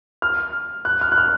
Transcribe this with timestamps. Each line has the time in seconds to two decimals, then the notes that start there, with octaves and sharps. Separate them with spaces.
0.22 F6
0.85 F#6
1.01 F6
1.12 F#6
1.18 F6